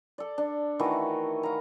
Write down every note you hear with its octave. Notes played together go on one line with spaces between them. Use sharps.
A4 D5
D4
D#3 E3 A3 F#4
F5 A#5